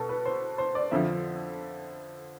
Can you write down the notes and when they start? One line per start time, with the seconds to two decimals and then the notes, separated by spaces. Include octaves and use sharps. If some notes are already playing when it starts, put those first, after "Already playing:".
Already playing: B2 B3 A4
0.09 B4
0.25 C5
0.58 C5
0.75 D5
0.91 F2 D3 F3 E5